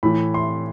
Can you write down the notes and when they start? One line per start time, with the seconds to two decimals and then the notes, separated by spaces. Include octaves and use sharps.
0.03 A2 E3 B5
0.34 C6